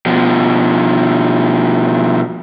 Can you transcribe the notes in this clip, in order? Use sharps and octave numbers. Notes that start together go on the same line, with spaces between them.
B2 F3